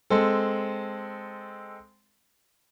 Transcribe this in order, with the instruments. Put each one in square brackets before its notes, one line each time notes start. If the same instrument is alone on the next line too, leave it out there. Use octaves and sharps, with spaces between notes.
[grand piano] G#3 C4 A4